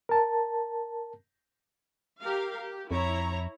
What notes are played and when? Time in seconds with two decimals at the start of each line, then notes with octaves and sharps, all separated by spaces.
0.09 A#4 A5
2.20 G4 A#4 F5
2.60 G4
2.91 F2 E4 C#5 A#5